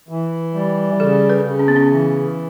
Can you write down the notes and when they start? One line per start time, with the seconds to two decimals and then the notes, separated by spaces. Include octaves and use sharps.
0.09 E3
0.54 G3
0.99 C#3 A4
1.30 B4
1.44 C#3
1.59 C#4
1.68 B3
1.76 C#4
1.90 E3